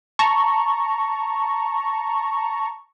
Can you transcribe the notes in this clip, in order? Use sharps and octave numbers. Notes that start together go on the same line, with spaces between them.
A5 A#5 C#6